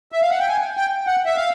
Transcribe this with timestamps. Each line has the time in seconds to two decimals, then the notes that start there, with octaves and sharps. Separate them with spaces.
0.12 E5
0.22 F5
0.30 F#5
0.39 G5
0.48 G#5
0.77 G5
1.07 F#5
1.26 E5
1.36 F5